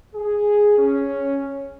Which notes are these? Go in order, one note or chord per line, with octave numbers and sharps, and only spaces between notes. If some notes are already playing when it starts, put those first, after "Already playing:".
G#4
C#4